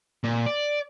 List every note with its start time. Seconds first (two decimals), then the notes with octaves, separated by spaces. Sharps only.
0.24 A#2
0.46 D5